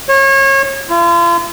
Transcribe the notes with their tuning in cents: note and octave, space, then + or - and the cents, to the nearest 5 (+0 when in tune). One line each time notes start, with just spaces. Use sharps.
C#5 -30
F4 -40